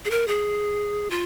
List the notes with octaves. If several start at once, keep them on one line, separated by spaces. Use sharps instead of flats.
G#4
A#4
G#4
F4